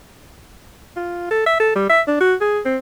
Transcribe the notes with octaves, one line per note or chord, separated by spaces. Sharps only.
F4
A4
E5
A4
G3
E5
D4
F#4
G#4
C4